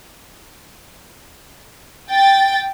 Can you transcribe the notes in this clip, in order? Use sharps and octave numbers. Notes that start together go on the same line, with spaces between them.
G5 A6